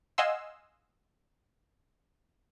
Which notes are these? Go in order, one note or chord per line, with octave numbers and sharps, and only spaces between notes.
D#5 F5 F#5 G#5 C6 E6